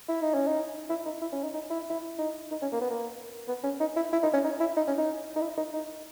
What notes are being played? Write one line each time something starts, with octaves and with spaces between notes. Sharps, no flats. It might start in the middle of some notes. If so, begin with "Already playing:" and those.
E4
D#4
C#4
D#4
E4
D#4
E4
C#4
D#4
D#4
E4
E4
D#4
D#4
C#4
A#3
B3
A#3
B3
C#4
D#4
E4
E4
D#4
C#4
D#4
E4
D#4
C#4
D#4
D#4
E4
D#4
D#4